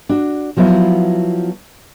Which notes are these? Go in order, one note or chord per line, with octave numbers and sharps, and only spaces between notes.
D4 F#4
F3 F#3 B3 E4 F4